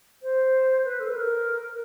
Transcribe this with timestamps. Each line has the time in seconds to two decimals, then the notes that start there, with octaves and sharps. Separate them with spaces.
0.23 C5
0.85 B4
1.00 A4
1.09 B4
1.15 A#4